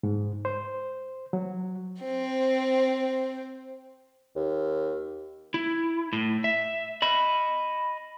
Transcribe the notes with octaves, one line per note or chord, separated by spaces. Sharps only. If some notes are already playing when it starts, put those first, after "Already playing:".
G#2
C5
F#3
C4 C5
D#2
E4
A2
E5
D#5 B5